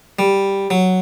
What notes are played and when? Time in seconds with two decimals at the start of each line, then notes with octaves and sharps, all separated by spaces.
0.19 G3
0.70 F#3